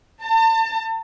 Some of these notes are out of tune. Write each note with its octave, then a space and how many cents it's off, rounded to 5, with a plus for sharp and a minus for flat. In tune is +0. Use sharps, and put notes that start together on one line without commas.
A5 +40